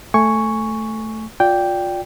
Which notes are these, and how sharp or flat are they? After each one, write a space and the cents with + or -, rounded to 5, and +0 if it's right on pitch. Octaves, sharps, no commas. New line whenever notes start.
A3 +0 G#5 +0 C#6 +0
F4 +25 D5 -10 G5 +0